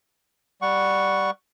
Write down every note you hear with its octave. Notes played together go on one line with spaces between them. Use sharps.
G3 F#5 C#6